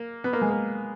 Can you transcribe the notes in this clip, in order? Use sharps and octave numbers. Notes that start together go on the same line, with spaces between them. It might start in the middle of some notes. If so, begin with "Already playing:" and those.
Already playing: A#3
B3
A#3
G#3
A#3